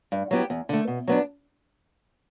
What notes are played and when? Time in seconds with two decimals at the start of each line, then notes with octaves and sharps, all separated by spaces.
0.12 G2
0.31 F#3 B3 E4 G4
0.50 E2
0.69 D3 A3
0.87 B2
1.07 F#3 B3 D4